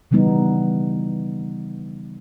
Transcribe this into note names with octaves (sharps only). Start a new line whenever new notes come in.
C#3 E3 G3 B3 D#4